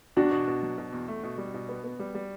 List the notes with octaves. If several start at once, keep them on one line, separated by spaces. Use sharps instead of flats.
E2 D4 F#4
B2
B2
F#3
B2
E2
A3
B2
G3
B2
B3
B3
G3
G3